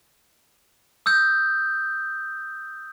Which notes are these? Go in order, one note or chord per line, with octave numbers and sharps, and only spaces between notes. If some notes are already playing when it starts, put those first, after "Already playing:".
D#6 E6 G6